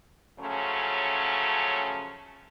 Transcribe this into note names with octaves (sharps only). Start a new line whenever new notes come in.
C#3 F3 F#3 A3 C#4